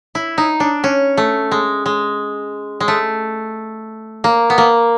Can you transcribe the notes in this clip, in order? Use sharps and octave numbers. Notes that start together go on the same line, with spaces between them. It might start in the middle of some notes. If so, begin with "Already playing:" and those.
E4
D#4
D4
C#4
A3
G#3
G#3
G#3
A3
A#3
B3
A#3